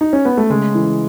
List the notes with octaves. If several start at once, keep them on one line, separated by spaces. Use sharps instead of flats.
D#4
C#4
B3
A3
C#3 G#3
E3